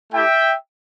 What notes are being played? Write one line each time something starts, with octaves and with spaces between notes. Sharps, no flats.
A3 E4 G4 E5 G5